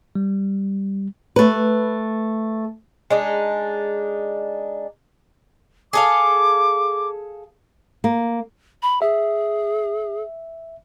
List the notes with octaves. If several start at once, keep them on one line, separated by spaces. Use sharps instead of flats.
G3
A3 B4
G#3 D4 D#4
G#4 A4 F5 D6
A#3
B5
G#4 E5